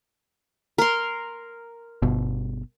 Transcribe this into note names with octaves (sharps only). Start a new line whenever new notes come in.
A#4 C6
G1 B2